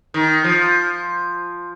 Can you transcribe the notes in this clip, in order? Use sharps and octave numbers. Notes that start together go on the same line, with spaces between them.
D#3
F3